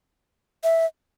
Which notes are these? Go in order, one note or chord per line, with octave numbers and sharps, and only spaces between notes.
E5